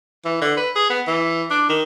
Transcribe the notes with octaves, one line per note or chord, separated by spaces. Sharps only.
E3
D3
B4
G#4
B3
E3
D4
D#3